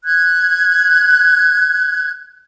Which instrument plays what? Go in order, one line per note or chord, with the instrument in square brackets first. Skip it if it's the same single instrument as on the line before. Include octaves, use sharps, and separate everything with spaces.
[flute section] F#6 G#6